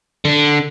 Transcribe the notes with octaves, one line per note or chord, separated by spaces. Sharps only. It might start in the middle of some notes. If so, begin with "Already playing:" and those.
D3